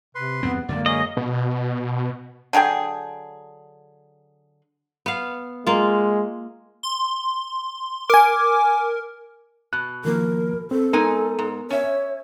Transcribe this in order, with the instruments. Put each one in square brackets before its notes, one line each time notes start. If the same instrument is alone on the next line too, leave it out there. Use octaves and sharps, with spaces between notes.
[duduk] C3 [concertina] B4 C6
[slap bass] E2 G2 C4 [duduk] B3
[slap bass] F#2 D3 G#3 [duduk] A#3 [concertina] D5
[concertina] G#4 A#4 C#5 [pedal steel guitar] D#5
[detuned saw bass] B2
[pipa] D3 F#3 G#4 G5
[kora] B3 F5
[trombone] G#3 [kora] A#3 F4
[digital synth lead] C6
[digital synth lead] A#4 [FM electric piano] G#5 D6
[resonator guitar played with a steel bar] B2 [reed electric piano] F#6
[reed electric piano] D#3 F3 A#3 [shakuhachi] A#4
[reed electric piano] C4 [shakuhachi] A4
[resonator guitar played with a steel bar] G#3 D#4 G#5 [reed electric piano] B3 A#4
[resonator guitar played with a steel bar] G#2
[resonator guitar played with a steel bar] C#4 E5 [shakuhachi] C#5